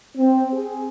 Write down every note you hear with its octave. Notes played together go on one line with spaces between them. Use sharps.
C4
G#4